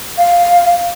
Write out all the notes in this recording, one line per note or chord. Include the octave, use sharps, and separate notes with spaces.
F5